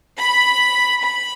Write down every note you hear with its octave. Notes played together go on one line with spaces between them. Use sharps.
B5
B5